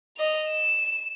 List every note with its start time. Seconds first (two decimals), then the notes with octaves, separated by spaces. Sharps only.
0.17 D#5 F7
0.49 E7